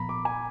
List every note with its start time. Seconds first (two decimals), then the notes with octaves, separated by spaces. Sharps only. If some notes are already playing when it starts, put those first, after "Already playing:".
Already playing: A#2 F3 B3 A#5 B5
0.09 D6
0.25 G#5